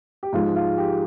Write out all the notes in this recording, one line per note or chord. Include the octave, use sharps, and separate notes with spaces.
G4
G#2 F3 G#3 F4
F4
G4